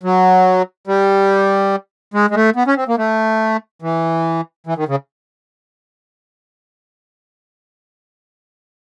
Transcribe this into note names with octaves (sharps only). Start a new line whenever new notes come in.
F#3
G3
G#3
G#3
A3
B3
C#4
C4
A#3
A3
E3
E3
D#3
C#3